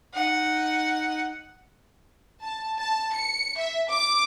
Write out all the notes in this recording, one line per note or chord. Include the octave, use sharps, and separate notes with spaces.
D#4 F#5
A5
A5
C#7
E5
D6